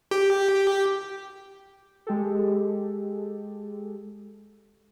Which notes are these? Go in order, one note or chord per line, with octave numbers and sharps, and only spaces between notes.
G4
G#3 G4 A4